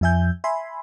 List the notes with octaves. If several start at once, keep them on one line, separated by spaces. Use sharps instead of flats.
F2 F3 E5 G#5 G6
E5 G#5 B5 C6